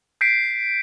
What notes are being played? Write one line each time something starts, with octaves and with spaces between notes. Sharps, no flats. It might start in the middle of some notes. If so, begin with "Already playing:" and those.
G6 B6 C7 D7